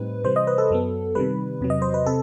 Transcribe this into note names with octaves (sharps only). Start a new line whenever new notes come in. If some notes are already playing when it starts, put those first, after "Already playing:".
Already playing: A2 G3 C4 D#4 B4
C3 E3 G3 C5
D#5
B4
A4
F#2 F#3 B3
C3 D#3 G3 B4
E2 C3 F#3
D#5
C5
B4
C3 A4